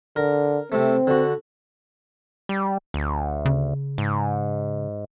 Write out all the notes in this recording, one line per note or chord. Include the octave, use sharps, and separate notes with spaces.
D3 A#4
C3 A3 C4
D3 F#4
G3
D2
C#3
G#2